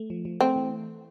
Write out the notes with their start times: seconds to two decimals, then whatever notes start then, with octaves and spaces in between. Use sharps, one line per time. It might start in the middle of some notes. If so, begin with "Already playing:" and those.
Already playing: A3
0.10 F3
0.25 F3
0.41 A3 C4
0.56 E3